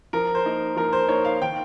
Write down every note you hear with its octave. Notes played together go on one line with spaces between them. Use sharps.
F3 A#4
C5
A#3 D#4
F3 A#4
C5
A#3 D#4 C#5
F5
D#3 G5